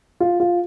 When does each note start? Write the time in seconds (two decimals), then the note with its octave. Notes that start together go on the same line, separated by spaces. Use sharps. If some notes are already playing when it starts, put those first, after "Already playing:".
0.20 F4
0.40 F4